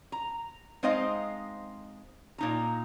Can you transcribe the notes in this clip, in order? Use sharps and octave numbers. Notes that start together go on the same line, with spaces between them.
A#5
G#3 C4 D#4 C5 D#5 F5
A#2 D#4 A#5